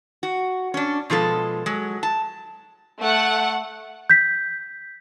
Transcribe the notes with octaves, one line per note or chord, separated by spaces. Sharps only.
F#4
C#4 D4
B2 F3 G#3 A4
F#3 G#3
A5
A3 F#5
G6 B6